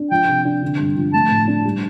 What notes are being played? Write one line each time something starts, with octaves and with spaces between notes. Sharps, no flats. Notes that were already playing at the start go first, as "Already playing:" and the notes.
Already playing: D4
F3 G5
C3
D4
D3
G2
F3
A3 A5
A2
D4
G3